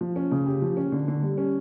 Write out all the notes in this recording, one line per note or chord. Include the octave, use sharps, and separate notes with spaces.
F3
C#4
C#3
G4
F3
C#4
D3
D3
G3
C#4